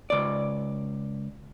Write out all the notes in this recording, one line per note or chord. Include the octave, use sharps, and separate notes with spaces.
C#2 D5